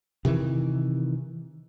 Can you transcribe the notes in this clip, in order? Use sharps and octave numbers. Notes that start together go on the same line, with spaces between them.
C3 D#3 E3